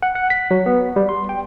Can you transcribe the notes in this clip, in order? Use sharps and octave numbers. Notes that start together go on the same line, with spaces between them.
F#5
F#5
B6
F#3
B3
G3
C6
G5